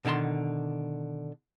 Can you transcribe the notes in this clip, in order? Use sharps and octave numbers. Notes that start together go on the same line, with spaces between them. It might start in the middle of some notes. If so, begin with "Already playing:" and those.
B2 D3 D#3 A5 C6